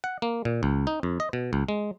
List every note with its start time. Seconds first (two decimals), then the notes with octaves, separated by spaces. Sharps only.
0.04 F#5
0.22 A#3
0.45 A#2
0.63 C#2
0.87 D#4
1.03 F2
1.20 D#5
1.33 B2
1.53 C#2
1.69 G#3